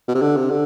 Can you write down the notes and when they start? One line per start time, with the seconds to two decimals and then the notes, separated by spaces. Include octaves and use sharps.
0.08 B2
0.15 C3
0.22 D3
0.36 C3
0.51 D3